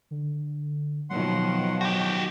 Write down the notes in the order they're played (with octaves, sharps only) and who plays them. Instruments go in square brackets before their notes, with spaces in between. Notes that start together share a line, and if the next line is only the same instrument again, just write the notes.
[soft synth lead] D3
[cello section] B2 D#3 F3 [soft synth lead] F#3 [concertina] F#5 C6
[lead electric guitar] F#4 G4 [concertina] G5